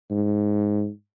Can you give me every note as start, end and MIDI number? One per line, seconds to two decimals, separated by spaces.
0.11 0.89 44